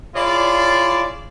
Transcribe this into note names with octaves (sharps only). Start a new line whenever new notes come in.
E4 F4 G#4 C#5 D5